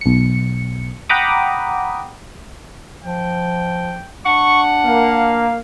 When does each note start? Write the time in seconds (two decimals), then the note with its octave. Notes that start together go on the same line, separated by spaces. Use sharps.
0.01 B1 C#7
1.09 F#5 G5 A#5 B5 D6 D#6
3.04 F3 G5
4.26 D4 F#5 C#6
4.85 A#3 F5